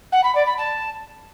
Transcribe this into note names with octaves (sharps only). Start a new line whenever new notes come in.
F#5
B5
D5
B5
A5